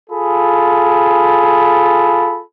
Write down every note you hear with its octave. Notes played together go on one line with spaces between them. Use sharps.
F4 G#4 A4 B5